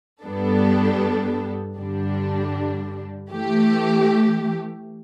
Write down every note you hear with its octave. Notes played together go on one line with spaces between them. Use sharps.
G2 G3 B3 D4 A4
G2 D3 G3 D4
E3 A3 G4